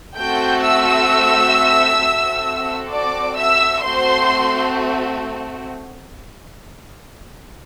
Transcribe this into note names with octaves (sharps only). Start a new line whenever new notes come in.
A3 C4 F#4 A4 G5 G6
E5 E6
C4 F#4 A4
D5 D6
E5 E6
A3 C4 F#4 C5 C6